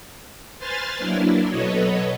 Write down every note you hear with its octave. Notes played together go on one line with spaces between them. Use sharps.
B4 C5 G#5 C6 F6 A6
F#3 A#3 D4 E4
B2 F#3 A4 B4 C#5 D#5